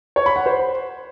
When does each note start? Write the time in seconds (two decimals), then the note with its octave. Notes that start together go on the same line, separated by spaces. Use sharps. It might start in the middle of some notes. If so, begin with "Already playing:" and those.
0.16 C#5
0.26 B5
0.36 F#5
0.46 C5